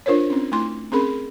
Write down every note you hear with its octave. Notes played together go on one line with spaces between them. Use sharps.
D4 F4 A#4 C5 C#5
C4 C#4
A3 E4 C6
C4 C#4 G#4 A#4 B5